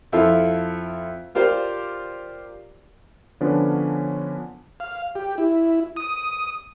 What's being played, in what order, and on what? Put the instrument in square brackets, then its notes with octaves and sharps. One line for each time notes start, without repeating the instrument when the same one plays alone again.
[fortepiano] F2 E4 F4 A4
F4 G4 A#4 C5 D5 F5
[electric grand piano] D3 F3 B3 C#4 D4 B4
[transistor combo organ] F5
G4
E4
D#6